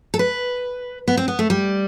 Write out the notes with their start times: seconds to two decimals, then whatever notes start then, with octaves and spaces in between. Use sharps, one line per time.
0.14 A4
0.19 B4
1.08 B3
1.17 C4
1.28 B3
1.39 A3
1.50 G3